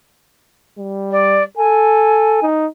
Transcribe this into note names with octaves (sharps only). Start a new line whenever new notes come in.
G3
D5
A4 G#5
D#4